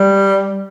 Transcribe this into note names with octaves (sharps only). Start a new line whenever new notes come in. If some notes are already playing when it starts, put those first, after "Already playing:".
Already playing: G3